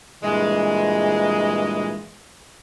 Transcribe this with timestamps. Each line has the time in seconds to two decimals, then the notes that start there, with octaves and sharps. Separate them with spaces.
0.23 G2 A#2 E3 G#3